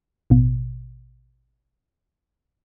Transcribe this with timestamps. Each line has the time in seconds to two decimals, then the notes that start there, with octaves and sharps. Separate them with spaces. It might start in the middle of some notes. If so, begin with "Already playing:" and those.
0.30 A1 B2